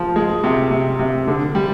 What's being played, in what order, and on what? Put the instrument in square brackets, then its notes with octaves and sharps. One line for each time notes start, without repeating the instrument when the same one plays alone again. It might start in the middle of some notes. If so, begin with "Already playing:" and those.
Already playing: [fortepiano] F3
G#3
C3
C3
C3
D3
G3